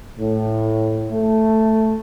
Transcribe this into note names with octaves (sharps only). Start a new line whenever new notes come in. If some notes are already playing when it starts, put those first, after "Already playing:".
A2
A3